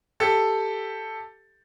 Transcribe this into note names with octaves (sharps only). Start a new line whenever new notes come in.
G4 A4